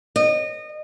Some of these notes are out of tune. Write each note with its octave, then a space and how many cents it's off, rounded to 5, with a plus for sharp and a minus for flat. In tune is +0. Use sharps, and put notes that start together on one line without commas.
D#5 -25